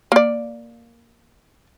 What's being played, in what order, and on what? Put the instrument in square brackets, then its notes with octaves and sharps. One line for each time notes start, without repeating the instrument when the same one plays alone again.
[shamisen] A#3 D5